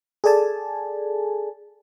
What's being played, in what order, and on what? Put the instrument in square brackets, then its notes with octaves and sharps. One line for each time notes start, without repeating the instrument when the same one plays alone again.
[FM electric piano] G#4 A4 D5 G#5 A5